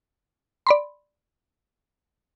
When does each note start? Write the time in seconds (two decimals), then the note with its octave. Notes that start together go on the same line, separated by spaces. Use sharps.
0.67 D5 B5 C6